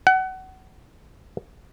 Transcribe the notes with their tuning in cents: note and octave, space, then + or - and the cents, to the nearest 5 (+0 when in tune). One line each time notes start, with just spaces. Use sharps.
F#5 +25